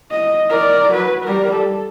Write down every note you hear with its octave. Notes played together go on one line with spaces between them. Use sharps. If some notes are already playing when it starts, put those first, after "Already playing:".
D#5
A#4 D5
F#3 B4
G3 A#4
A4